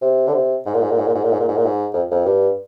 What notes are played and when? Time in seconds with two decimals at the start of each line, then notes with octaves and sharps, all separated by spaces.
0.02 C3
0.27 D3
0.33 C3
0.66 G#2
0.74 A#2
0.82 G#2
0.90 A#2
0.98 G#2
1.07 A#2
1.15 G#2
1.24 A#2
1.32 G#2
1.40 A#2
1.48 G#2
1.57 A#2
1.65 G#2
1.93 F2
2.11 F2
2.25 G2